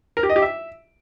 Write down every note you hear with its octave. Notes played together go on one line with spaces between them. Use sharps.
A#4
G4
D#5
G4
E5